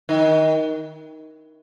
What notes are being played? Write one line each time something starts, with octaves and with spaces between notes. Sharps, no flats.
D#3